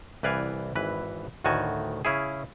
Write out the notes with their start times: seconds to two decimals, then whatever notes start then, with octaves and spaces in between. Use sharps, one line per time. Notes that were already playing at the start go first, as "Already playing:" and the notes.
0.23 C2 E3 B4 D5 F5 G#5
0.75 G#1 E3 B4
1.44 D2 A2 D#3 F#4 G#5 A5
2.05 C#3 C#4 E4 G#4